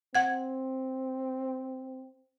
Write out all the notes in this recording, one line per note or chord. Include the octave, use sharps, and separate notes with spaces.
C4 F#5 G#6